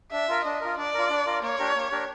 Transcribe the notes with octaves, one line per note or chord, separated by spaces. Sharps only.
D4 E5
F4 A#4
D4 D#5
F4 A#4
D4 D5
F4 A#4
D4
F4 A#4
A#3 C#5
D4 G4 A#4
A#3
D4 G4 A#4